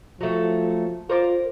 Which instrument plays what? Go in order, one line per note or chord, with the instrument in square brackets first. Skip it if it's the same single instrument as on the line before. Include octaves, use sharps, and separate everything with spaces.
[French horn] F3 [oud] F#3 A3
[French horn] F4 [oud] A#4 C5 D5